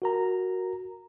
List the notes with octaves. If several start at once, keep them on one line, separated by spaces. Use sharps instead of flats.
F#4 A#4 A#5